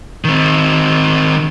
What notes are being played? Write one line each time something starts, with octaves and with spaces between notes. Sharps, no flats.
D#3 C4